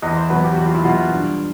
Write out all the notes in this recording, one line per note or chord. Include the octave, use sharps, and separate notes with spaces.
E2 D#5
C5
B2 F#3 B4
G4
E2 F#4
F4
E4
B2 F#3 F4
G2